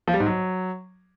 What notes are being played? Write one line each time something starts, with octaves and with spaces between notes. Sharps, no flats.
F3
G3
G#2
F#3